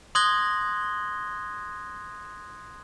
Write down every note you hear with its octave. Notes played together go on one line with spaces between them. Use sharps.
C6 D#6 F#6 G#6 A#6 G7